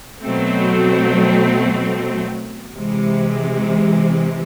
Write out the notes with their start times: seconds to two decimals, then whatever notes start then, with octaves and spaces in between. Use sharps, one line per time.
0.21 B2 F#3 A3 C4
2.75 C3 E3 G#3